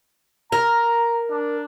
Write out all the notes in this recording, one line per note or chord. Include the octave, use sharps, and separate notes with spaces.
A#4 A#5
D4